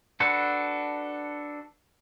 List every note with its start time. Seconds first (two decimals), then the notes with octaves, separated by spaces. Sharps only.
0.20 D4 F#4 A4 B4